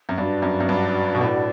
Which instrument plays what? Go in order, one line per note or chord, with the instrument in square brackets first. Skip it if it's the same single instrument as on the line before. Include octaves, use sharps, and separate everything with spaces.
[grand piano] F#2
[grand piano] G2 [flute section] D4 F#4 B4 D5
[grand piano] F#2
F#2
G2
B2
A2